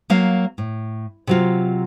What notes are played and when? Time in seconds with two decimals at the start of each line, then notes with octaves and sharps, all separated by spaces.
0.10 F#3 A#3 F5
0.58 A2
1.27 C3 F#3 F4